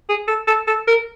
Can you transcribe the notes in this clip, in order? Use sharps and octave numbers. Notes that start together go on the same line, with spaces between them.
G#4
A4
A4
A4
A#4